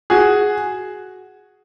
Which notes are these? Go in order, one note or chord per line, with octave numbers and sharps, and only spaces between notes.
F#4 G#4